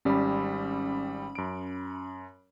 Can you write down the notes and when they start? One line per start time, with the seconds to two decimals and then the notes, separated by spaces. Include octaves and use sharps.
0.05 G#1 G3 C#4 B5
1.35 F#2 D7